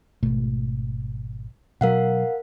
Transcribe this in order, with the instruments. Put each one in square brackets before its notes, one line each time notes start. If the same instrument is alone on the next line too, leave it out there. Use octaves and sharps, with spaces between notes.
[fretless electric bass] G#1 B2 A3
[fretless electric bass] B2 F#3 [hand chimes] A#4 F5 F#5